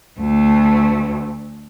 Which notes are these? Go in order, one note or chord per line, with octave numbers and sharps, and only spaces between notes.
D2 A3